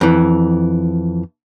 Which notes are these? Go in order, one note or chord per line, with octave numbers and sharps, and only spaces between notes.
F2 E3